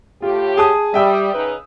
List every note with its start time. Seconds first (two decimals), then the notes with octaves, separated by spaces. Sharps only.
0.22 A2 F4 G4
0.57 G#4 A5 D#6
0.94 G3 E5 G5 E6
1.34 C#3 D#4 B4